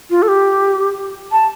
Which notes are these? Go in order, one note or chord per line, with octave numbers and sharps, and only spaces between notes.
F4
A4
G4
A5